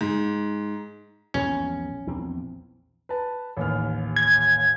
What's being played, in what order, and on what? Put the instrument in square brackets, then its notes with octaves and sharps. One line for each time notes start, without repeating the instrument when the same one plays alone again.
[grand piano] G#2
[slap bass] A#1 E2 G#2 [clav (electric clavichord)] C#4
[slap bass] A#1 E2 C4
[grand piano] B4 A5
A1 D#2 F6
[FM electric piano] G#6